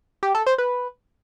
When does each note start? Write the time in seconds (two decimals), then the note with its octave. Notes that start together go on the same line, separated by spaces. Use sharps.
0.23 G4
0.35 A4
0.47 C5
0.58 B4